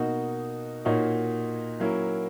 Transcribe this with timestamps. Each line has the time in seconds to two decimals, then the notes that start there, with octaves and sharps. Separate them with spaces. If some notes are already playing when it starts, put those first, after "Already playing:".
Already playing: B2 A#3 D#4 F#4
0.85 A#2 A#3 D#4 F#4 C#5
1.80 F#3 A#3 C#4 E4 A#4